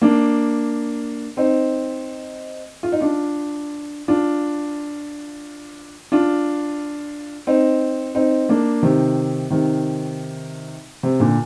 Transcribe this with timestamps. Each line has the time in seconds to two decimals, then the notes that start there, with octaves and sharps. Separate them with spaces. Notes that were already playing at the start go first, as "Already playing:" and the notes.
0.02 A#3 D4
1.37 C4 D#4
2.83 F4
2.92 D#4
3.01 D4 F4
4.08 D4 F4
6.12 D4 F4
7.47 C4 D#4
8.15 C4 D#4
8.49 A#3 D4
8.83 C3 D#3
9.50 C3 D#3
11.03 C3
11.20 A#2 D3